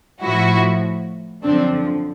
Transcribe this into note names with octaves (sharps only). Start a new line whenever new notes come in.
A2 F3 E4 F#4
F#2 D3 F3 C4 D4